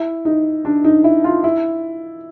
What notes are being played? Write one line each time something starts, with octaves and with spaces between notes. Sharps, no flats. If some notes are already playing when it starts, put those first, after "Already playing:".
Already playing: E4
D#4
D4
D#4
E4
F4
E4